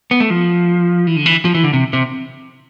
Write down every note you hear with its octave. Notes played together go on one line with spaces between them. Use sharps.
B3
A3
F3
E3
D3
E3
F3
E3
D3
C3
C3